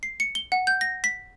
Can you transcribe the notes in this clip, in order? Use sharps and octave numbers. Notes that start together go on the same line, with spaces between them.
C7
C#7
G7
F#5
G6
A#6
B6